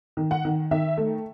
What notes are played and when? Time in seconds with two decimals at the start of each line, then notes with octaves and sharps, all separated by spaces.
0.17 D#3
0.31 F#5
0.45 D#3
0.71 D#3 E5
0.97 A3